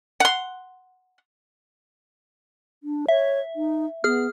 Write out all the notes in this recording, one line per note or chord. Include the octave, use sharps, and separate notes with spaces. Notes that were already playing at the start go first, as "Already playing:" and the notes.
F#5 C6
D4
C#5 E5
D#4
B3 G#4 F6